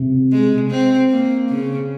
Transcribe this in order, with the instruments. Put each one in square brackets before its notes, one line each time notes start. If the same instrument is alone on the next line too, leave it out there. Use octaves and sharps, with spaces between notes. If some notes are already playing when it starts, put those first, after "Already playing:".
Already playing: [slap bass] C3
[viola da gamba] G#3
C4
A#3
C#3